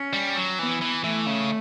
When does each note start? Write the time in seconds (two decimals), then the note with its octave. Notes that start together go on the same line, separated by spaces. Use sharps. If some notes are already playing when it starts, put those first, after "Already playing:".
Already playing: C#4
0.13 G3
0.36 F#3
0.59 E3 B3
0.81 E3
1.04 E3 A3
1.26 C#3